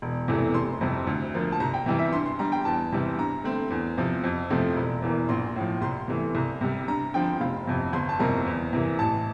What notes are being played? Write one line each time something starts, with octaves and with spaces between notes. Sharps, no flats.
E1
E2 C3 E3 A3
F1 C6
F2 C3 G3 C4
D2
D3 F3 A#3
A5
C2 A#5
G5
C3 E3 G3
E5
G2 C6
C6
D3 G3 A#5
G5
E2 A5
C3 E3 G3 C4
G2 A#5
D3 A3 C4
E2
C3 F3
F2
C3 F3 A3 C4
E1
E2 E3 A#3
A#1 C6
A2 F3
C2 C6
C3 E3 A3
C2
C3 G3
G2 A#5
D3 F3 C4 G5
F1 F5
F2 C3
G1 C6
A5
F2 C3 G3 A#3 A#5
E2
C3 E3 A#3
A1 A5